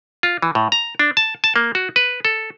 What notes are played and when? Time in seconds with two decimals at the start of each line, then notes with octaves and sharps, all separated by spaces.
0.23 F4
0.42 E3
0.55 A2
0.72 A#5
0.99 D4
1.17 A5
1.44 A5
1.56 A#3
1.75 F#4
1.96 B4
2.25 A4